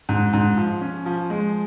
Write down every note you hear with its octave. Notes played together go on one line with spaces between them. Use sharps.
G#2
G#2
F3
C#4
F3
G#3